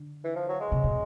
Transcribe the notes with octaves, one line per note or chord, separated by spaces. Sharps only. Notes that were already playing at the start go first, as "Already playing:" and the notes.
Already playing: D3
E3
F3
F#3
G#3
C3
B2